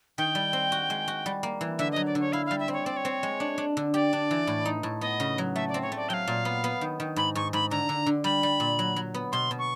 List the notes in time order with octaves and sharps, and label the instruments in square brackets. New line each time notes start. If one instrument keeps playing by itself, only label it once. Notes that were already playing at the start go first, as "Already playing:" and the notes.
[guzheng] D#3 [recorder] G5
[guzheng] G3
C4
F#4
G#3
F#4
G3
A#3
E3
[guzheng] D3 [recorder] E5
[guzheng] F#3 [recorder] D#5
[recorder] D5
[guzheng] D3 [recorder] C#5
[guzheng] E4 [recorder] F5
[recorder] F5
[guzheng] G3
[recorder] E5
[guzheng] C4
[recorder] C#5
[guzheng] C4 [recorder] D5
[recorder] C#5
[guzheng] C4
G#3
D4
D4
D3
[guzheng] G4 [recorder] D5
[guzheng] D4
E3
A2
D#4
A2
[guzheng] B3 [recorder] D#5
[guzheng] C#3
F#3
[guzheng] A3 [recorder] E5
[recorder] D5
[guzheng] C4
[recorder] C#5
[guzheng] A3 [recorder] D5
[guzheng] F#3 [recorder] F5 G5
[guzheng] A#2
B3
B3
D#3
D#3
[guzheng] G#2 [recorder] B5
[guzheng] G#2 [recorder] C#6
[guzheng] G#2 [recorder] B5
[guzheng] D3 [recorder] A#5
[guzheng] D3
D3
[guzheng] G3 [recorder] B5
[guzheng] G3
A#2
F#3
F#3
B3
[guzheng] B2 [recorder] C6
[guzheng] B2
[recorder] C#6